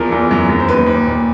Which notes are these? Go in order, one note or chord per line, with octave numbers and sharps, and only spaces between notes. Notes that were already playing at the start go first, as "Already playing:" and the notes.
Already playing: E2 F3 A#4
E2
F#2
F#2
C5
D#2 B4
D#2
A#2